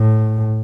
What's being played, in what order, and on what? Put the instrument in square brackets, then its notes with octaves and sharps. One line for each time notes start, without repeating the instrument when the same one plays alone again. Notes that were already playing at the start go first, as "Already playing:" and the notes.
Already playing: [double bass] A2